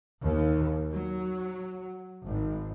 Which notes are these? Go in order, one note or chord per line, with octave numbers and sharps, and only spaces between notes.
D#2
F#3
G#1